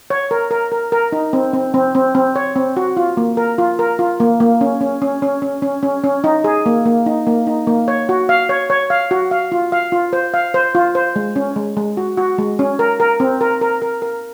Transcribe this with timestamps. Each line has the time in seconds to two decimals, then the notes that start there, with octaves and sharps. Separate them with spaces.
0.10 C#5
0.31 A#4
0.51 A#4
0.72 A#4
0.92 A#4
1.12 D#4
1.33 C4
1.53 C4
1.74 C4
1.95 C4
2.15 C4
2.36 C#5
2.56 C4
2.77 F#4
2.97 F4
3.17 A#3
3.37 A#4
3.58 F4
3.79 A#4
3.99 F4
4.20 A#3
4.40 A#3
4.61 C#4
4.81 C#4
5.02 C#4
5.22 C#4
5.42 C#4
5.62 C#4
5.83 C#4
6.04 C#4
6.24 D#4
6.44 G#4
6.66 A#3
6.85 A#3
7.06 D#4
7.27 A#3
7.47 D#4
7.67 A#3
7.88 C#5
8.09 F#4
8.29 F5
8.49 C#5
8.70 C#5
8.90 F5
9.11 F#4
9.31 F5
9.52 F4
9.72 F5
9.92 F4
10.13 C5
10.34 F5
10.54 C5
10.75 F4
10.95 C5
11.16 G#3
11.36 C#4
11.56 G#3
11.77 G#3
11.97 F#4
12.17 F#4
12.38 G#3
12.59 C#4
12.79 A#4
13.00 A#4
13.20 C4
13.41 A#4
13.61 A#4
13.82 A#4
14.02 A#4